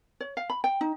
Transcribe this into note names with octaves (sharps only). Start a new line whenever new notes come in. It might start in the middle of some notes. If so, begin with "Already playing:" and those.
C#5
F5
B5
G5
D#4